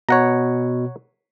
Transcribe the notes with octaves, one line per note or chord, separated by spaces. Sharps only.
B2 C#5 F#5 A#5